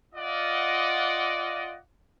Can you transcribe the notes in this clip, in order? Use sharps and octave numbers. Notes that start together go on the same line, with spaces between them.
F4 D5 D#5 F#5